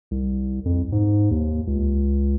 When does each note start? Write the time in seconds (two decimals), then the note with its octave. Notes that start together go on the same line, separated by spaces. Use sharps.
0.11 C2
0.65 F2
0.92 G#2
1.31 D#2
1.67 C#2